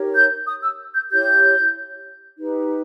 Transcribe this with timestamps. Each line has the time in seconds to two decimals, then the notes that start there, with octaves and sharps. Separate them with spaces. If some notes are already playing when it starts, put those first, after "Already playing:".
Already playing: D#4 G4 A#4 C#5
0.15 G6
0.47 D#6
0.63 E6
0.94 G6
1.11 E4 G4 C#5 G6
2.38 D#4 G4 B4